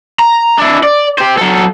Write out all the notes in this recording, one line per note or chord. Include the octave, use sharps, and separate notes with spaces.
A#5
D4 E4
D5
G4 C5
F#3 A4